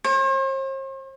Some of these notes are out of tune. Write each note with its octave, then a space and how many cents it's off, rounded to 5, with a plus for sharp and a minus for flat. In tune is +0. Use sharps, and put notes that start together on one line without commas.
C5 +45